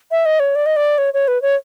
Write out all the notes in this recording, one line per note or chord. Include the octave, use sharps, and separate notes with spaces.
E5
D#5
C#5
D5
D#5
D5
C#5
C#5
B4
C#5